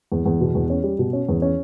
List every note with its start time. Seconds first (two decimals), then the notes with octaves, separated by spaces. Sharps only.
0.12 E2
0.26 E2
0.41 B2
0.55 E2
0.70 C#4
0.84 G3
0.99 B2
1.13 C#4
1.29 E2
1.42 C#4